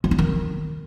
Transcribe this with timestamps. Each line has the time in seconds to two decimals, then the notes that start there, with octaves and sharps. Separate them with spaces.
0.04 G#3
0.11 D#4
0.19 D#3